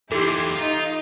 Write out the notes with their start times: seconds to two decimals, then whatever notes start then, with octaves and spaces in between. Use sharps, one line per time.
0.12 E2 D#3 E4 G4 A4 C6
0.56 D#4 F4